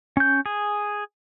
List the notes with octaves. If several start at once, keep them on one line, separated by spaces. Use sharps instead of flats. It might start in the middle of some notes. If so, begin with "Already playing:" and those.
C#4 G6
G#4